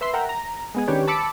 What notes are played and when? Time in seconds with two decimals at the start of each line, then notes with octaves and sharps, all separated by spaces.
0.01 B4 E5 B5 C6
0.13 A#4 E5 F#5 G5 A#5
0.29 A#5
0.75 G#3 B3 G#4
0.88 D#3 C#4 D4 G4 B4 C#5
1.08 A5 B5 D6 E6 C#7